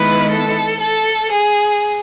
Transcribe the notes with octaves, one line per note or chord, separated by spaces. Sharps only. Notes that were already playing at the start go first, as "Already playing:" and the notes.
Already playing: D#3 G#3 B3 E4 B4
A4
A4
G#4